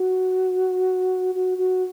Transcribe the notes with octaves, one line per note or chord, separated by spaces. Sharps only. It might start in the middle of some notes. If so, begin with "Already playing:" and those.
Already playing: F#4
F#4
F#4